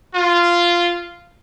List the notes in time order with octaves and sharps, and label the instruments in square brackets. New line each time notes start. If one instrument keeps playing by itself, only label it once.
[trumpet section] F4